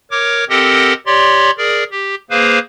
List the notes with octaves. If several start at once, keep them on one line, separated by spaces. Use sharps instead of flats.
A#4 C#5 D6
C4 G4 A4 A#4 D#5 F#5
G4 C#5 D5 C6
G#4 A#4 D5
G4
A#3 G#4 B4 C5 F5